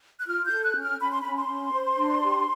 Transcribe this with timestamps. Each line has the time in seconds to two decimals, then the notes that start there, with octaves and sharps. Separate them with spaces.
0.20 F#6
0.26 F4 F6
0.45 G6
0.50 A4
0.63 F#6
0.75 C#4
0.81 F6
0.99 C#4 B5
1.11 C6
1.21 C#4 B5
1.36 C6
1.49 C#4
1.73 C5
1.97 D4
2.22 G4